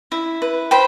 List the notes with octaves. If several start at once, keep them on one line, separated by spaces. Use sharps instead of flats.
E4
B4
C5 G5 B5